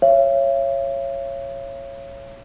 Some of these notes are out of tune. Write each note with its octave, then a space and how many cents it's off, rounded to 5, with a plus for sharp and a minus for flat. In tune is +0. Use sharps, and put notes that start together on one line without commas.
C#5 -10 E5 +45